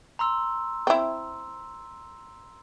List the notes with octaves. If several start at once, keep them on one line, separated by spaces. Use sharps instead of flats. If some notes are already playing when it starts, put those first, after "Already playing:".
A#5 C6 E6
C4 E4